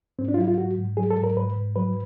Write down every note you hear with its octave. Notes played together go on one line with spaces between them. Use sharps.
G#2 C4
D4
F4
F#3 E4
F4
G#2 F#4
G#2
F#3 G#4
A4
G#2
A#4
G#2 B4
G#2
F#3 B4